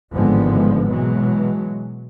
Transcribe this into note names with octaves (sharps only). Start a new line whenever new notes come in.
G#1 A2 D3 F3 G#3 B3
B2 E3 F#3 G#3